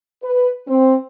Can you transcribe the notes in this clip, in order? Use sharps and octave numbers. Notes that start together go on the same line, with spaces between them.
B4
C4